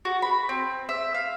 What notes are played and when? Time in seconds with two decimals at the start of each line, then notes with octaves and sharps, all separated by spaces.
0.05 F#4
0.22 B5
0.49 C4
0.89 E5
1.14 F5